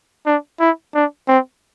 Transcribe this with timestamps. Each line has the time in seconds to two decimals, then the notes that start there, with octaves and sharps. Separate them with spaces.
0.26 D4
0.60 E4
0.94 D4
1.28 C4